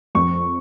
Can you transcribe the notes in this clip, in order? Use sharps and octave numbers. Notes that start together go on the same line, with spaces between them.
F2 C#6